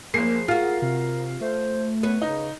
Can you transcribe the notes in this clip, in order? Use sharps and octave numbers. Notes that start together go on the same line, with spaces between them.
F#1 F3 A#3 G#4 C7
F4 F#4 A#4 F5
C3
A3 C5
B3 B4 C#5
C#3 D#4